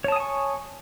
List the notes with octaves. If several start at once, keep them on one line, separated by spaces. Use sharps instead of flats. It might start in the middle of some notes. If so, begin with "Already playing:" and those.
C#5 G#5 A5 C#6 D#6